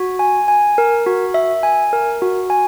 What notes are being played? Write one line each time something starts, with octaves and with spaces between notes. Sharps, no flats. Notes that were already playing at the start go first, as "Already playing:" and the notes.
Already playing: F#4
G#5
G#5
A#4
F#4
E5
G#5
A#4
F#4
G#5